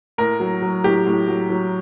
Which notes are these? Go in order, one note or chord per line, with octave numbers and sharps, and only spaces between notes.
A2 A#4
F#3
F#3
A2 G4
A2
F#3
F#3